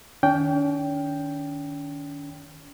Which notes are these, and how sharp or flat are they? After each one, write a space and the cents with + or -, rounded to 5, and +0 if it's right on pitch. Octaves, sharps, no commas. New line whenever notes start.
D#3 -10 C#4 +40 G5 +0